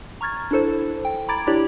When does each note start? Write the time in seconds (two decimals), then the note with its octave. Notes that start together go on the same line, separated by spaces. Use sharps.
0.21 A#5 C#6 F6 G#6 A6
0.51 D4 E4 A4 C5
1.05 G5
1.28 A#5 B5 D6 G#6 A6 D7
1.47 D4 E4 G4 C#5 D5